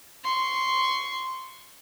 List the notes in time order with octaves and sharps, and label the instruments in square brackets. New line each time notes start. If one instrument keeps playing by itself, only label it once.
[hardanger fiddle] C6 C#6